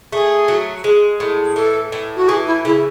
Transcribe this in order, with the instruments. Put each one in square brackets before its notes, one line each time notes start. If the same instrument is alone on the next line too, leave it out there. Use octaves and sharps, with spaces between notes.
[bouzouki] A3 [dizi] G#4
[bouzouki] F#3
G#3
A2
[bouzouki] E3 [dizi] A4
[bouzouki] A2
[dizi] F#4
[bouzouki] E3 [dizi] G#4
[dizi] E4
[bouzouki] C#3 [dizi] E4